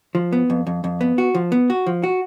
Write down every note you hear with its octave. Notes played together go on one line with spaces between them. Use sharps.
F3
B3
F2
F2
F2
B3
F#4
F3
B3
F#4
F3
F#4